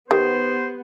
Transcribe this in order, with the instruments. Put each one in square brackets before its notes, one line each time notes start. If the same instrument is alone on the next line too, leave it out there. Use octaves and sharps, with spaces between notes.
[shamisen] D#3 [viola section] B3 [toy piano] G4 [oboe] C5